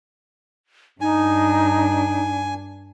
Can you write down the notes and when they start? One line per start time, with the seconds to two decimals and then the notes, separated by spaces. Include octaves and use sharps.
1.01 G2 D4 D#4 G#5